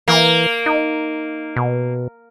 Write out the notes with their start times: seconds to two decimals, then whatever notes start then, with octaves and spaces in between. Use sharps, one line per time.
0.08 E3 A#3
0.66 D#4
1.56 B2